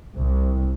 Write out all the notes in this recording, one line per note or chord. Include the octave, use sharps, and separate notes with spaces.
C2